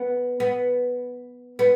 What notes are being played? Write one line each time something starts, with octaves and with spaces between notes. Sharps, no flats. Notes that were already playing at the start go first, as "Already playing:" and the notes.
Already playing: B3
B3
B3